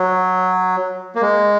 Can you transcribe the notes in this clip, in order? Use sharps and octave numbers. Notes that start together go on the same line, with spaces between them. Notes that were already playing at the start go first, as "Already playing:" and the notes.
Already playing: F#3
A#3
G#3